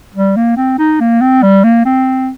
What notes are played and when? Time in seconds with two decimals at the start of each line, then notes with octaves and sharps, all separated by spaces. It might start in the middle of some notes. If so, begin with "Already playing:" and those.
0.15 G3
0.37 A#3
0.57 C4
0.79 D#4
1.01 A#3
1.21 C4
1.43 G3
1.64 A#3
1.86 C4